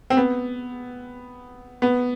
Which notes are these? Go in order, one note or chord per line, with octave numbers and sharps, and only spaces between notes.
C4
B3
B3